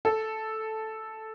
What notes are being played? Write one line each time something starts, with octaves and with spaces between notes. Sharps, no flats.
A4